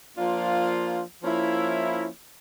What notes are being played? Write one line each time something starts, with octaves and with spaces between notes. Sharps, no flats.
F3 A#3 D4 F4
F3 A#3 C#4 E4